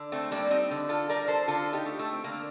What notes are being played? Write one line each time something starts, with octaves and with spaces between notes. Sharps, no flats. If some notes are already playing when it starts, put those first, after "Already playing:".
Already playing: D3
A3 C4
G3 A#3 D4
C4 D#4
D3
F4 A4
G3 A#4 D5
A4 C5
D3 F4 A4
D#4 G4
A3
A3
C4
D3 A#3